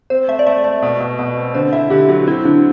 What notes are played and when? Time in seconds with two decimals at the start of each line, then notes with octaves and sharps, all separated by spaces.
0.10 C4 C5
0.28 A3 E5
0.39 D5
0.46 A3 E5
0.64 A3 D5
0.82 B2
1.00 B2
1.19 B2
1.37 C4
1.54 D3 C5
1.73 E4 E5
1.90 D3 G4
2.09 F#3 F#4
2.27 C4 E4
2.45 D3 D4